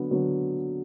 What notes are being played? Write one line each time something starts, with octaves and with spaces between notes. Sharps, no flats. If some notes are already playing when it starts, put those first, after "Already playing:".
Already playing: D3 F#3 B3
D3 F#3 B3